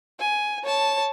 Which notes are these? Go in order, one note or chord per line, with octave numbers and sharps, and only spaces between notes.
G#5
C#5 A5